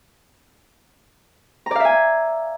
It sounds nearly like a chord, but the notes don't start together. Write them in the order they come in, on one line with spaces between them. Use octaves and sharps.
A#5 D5 F5 E5 G#5